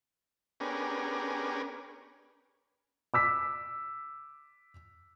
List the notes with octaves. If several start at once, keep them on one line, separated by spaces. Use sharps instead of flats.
B3 C#4 D4 G4 G#4 A#4
D6 E6 B6